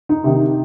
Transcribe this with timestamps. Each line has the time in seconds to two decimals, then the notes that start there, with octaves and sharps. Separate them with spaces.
0.09 D#4
0.24 C3 D#3